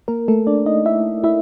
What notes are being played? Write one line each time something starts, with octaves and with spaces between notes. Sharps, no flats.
A#3 A#4
A3 A4
D4 D5
D#4 D#5
E4 E5
E4 E5